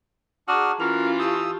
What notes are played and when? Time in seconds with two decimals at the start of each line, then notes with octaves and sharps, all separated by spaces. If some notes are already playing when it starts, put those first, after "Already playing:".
0.48 D4 F#4 G#4 A5 A#5 D#6 F6
0.80 E3 C#4 F4 F#4 A#4
1.20 G4 A5 C#6 D#6 E6